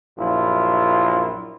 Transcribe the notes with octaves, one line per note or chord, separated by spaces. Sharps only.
A#1 F#2 E4 F4